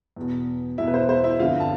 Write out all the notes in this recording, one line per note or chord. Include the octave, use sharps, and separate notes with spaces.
E2 B2
E2 B2 E4 E5
B4
C5
C5
E4 E5
G1 F2 D3 F3 F4 F5
A5